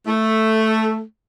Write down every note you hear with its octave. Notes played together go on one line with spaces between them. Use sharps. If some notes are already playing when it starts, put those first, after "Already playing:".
A3